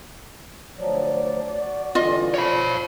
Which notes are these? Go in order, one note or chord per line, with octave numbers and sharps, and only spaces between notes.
D2 F3 F#3 D5
F#4
D3 E3 G3 F4 D#5
F3 C#5 B5